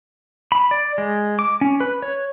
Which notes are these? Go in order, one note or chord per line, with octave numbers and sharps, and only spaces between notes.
B5
D5
G#3
D6
C#4
B4
C#5